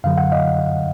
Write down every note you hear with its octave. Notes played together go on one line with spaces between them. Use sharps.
F#2 D3 F#3 F5
F#5
D#5 F5